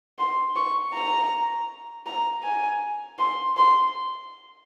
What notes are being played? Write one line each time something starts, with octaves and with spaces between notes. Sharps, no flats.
C6
C#6
A#5
A#5
G#5
C6
C6